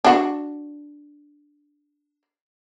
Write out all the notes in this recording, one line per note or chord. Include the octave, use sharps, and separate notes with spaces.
D4 F#4